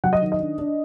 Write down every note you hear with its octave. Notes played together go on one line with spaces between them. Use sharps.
F#3 F#5
D#5
D#3
D#5
D4
D4